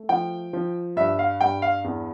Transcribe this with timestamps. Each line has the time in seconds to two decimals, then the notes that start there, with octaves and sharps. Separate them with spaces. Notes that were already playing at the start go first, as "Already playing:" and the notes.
Already playing: A3
0.09 F3 G5
0.53 F3
0.97 G2 E5
1.19 F5
1.40 G2 G5
1.62 F5
1.84 E2